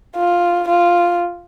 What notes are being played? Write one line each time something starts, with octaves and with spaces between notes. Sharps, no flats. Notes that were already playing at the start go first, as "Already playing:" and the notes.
F4
F4